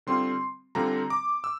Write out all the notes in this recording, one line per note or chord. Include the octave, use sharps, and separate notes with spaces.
D3 G3 C4 F4 C6
D3 G3 C4 F4 A#5
D6
E6